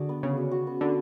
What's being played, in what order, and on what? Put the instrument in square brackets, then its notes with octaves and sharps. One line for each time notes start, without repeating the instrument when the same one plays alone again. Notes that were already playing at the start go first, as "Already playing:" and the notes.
Already playing: [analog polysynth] D3 [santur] F#4 G#4 D5
[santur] B3
[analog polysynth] C#3 [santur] B3
[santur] F#4
F#4
B3
[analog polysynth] D3 [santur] B3